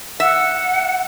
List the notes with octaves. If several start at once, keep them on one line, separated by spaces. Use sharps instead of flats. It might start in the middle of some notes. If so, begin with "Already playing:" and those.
E5 F#5